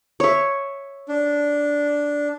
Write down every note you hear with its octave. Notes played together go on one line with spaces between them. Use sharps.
C#5 E5
D4